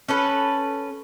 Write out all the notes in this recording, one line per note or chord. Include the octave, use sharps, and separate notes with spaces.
C#4 A4 B4